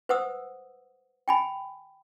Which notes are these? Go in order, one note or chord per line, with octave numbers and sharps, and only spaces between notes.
B4 C5 F#5 D#6 E6
G5 G#5 B5